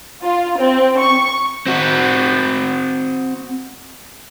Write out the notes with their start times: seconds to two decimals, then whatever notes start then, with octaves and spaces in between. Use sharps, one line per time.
0.24 F4
0.59 C4
0.99 C#6
1.67 C4 F#4